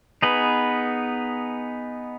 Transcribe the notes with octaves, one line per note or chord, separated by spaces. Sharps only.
B3 D#4 G#4 B4